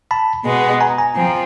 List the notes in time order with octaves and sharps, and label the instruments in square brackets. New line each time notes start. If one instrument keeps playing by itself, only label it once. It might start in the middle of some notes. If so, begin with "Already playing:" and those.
[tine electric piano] A5 B5
[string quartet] B2 G#3 B3
[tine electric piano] G#5 A#5
G#5 A#5
[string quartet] F3 C4